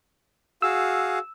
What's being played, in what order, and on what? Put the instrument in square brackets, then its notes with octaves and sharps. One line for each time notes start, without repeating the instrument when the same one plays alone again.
[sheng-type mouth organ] F#4 G#4 F5 [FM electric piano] E6